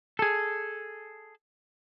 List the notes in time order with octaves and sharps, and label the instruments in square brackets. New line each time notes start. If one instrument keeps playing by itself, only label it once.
[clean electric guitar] G#4 A4